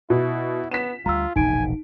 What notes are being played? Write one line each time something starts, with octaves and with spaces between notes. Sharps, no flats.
B2 E4
B3 B6 E7
D2 G3 F4 A#5 E6
E1 A#1 C3 D#4 G#5 D7